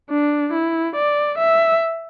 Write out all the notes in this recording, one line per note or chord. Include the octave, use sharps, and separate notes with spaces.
D4
E4
D5
E5